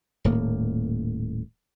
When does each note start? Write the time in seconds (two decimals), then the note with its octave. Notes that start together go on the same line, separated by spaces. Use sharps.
0.24 D#1 A2 A#3